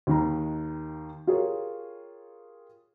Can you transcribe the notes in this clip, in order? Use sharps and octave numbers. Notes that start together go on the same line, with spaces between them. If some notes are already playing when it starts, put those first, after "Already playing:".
D#2 D#3 A#5
F4 G4 G#4 A#4 C#5